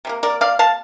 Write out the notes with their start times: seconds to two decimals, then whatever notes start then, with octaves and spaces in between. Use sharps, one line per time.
0.05 C3 G3
0.09 A#3
0.23 A#4 D5
0.41 D5 F5
0.59 F5 A5